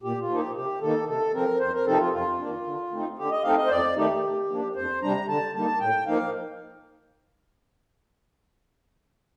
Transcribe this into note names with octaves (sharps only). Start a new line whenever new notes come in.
A#2 G4
F4
F3 A#3 D#4
G4
C3 G4
D#3 A#3 D#4 A4
C3 A4
F3 C4 A#4
F2 C5
A#4
C3 F3 C4 D#4 A4
F4
F2 F4
D#3 A#3 D4
D3
A3 C4 D#4
D3 G4
D#5
A3 C4 D#4 F5
D#5
C5
F2 D5
D#3 A3 D#4 G4
C3
F3 A#3 D4
F2 C5
C3 G3 D4 A#5
D3 A5
G3 A#3 D#4 A5
A2 G5
F3 A#3 D#4 F5